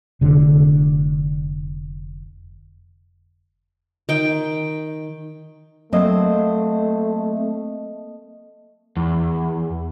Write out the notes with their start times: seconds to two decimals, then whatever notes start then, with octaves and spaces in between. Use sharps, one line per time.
0.21 F1 D3
4.09 D#3 G5
5.93 F#3 A3 A#3 C4 D#5 F5
8.97 E2